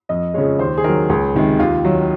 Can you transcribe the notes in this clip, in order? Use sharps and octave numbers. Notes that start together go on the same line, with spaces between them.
F2 D#5
C#3 F3 G#3 C#5
D#2 C5
G#4
D#3 F#3 A#4
C#2 G#4
C3 D#3 G#3
D#2 F4
D#3 F#3